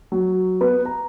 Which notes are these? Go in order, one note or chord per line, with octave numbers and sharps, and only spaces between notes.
F#3
B3
A#5